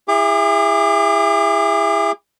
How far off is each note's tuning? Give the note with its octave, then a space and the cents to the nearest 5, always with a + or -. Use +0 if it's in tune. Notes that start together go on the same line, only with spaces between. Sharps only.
E4 +15 G#4 -35 D6 +20